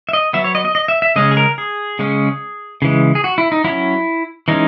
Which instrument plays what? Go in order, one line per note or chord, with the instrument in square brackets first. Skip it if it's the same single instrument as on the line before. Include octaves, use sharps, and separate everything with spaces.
[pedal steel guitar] E5
D#5
F#3 B3 E5
C#5
D#5
D#5
D#5
E5
E5
C#3 G#3 C#4 D#5
G#4
A#4
G#4
C#3 G#3 C#4
C#3 E3 G#3
G#4
F#4
E4
D#4
F#3 C#4 E4
E3 G#3 C#4 D#4